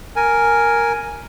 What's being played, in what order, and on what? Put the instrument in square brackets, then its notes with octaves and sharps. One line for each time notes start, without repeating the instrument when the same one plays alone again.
[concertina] A#4 G#5